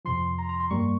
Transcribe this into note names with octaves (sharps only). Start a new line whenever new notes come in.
F2 C3 F3 C6
A#5
A#5
C6
G2 G3 A#3 C#6